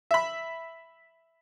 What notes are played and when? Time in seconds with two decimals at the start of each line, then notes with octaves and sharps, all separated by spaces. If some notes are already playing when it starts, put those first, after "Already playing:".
0.11 E5 B5